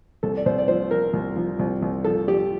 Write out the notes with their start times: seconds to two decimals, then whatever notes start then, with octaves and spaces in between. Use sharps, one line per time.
0.23 C2 A4
0.37 D5
0.46 C2 C5
0.58 D5
0.68 F3 C5
0.91 F3 A#4
1.13 C2
1.36 F3
1.59 C2
1.82 C2
2.04 F3 A4
2.27 F3 G4